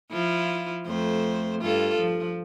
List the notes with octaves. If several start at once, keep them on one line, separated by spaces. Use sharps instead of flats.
F3 E4 F4
F2 A3 C5
G2 F4 A4
F3